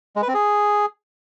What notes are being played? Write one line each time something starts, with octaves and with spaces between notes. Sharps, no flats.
G#3
B4
C4
G#4